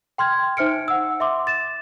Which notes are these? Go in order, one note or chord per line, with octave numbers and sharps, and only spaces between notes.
G5 C6 F6 G#6
D#4 C5 E5 F6 C#7 D7
F#5 E6
E5 C6 D6
A6 E7